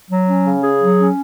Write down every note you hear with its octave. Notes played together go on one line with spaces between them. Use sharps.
F#3
C#4
C#3
G#4
F#3
C#4